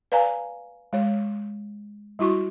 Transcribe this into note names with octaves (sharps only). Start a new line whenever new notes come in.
B4 D5 F5 G#5 A#5
G#3 C#5
G3 E4 F#4 C#6